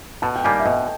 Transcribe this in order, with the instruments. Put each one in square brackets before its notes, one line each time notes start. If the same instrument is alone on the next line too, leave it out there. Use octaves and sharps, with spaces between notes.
[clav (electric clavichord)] B2 [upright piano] A5
[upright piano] G5
[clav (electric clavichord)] G3 A#3 D#4 G4 [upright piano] G#5
[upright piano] E5
[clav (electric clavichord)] B2 [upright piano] D#5